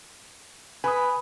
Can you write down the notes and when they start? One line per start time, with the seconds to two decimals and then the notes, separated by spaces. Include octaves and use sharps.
0.84 B4 G#5 B5 D#6